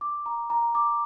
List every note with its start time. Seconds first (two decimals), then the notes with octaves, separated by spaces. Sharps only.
0.01 D6
0.26 A#5
0.50 A#5
0.75 D6